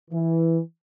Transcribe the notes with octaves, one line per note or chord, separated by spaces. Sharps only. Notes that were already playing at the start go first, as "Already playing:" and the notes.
E3